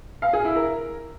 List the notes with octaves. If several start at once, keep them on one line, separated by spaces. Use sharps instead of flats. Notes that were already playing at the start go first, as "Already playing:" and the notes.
F5
G#4
E4
A#4